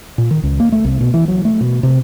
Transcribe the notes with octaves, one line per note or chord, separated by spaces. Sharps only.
A#2
D#3
C#2
A#3
A3
C2
B2
E3
F#3
A3
B2
C3